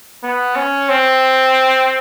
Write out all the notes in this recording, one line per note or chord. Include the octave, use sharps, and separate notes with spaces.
B3
C#4
C4